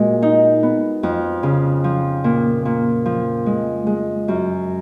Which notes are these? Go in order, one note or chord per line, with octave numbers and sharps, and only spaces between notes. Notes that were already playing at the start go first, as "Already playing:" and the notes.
Already playing: A#2 G#3 F#4
D#4
B3
F2
C#3
F3
A#2
A#2
F3
G#3
G#3
F#2